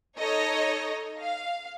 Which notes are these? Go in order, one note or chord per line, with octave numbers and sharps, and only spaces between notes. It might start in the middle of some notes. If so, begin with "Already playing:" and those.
D#4 A4 C#5 D#5
F5